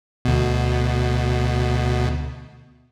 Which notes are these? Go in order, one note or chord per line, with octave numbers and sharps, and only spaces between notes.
D2 B2